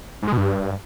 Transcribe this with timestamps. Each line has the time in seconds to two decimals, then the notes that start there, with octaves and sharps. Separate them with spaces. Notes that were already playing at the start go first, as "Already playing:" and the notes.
0.22 G#2
0.27 G#3
0.33 B2
0.38 G2